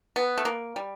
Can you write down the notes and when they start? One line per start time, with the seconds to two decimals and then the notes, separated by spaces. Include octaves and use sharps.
0.16 B3
0.38 A3
0.45 A#3
0.76 G3